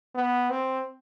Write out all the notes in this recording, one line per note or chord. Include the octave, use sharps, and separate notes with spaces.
B3
C4